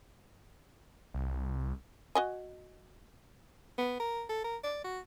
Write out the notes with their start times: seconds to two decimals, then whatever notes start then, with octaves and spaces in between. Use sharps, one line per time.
1.14 C2
2.15 F#4 D#5 G#5
3.78 B3
3.99 A#4
4.29 A4
4.44 A#4
4.63 D5
4.84 F#4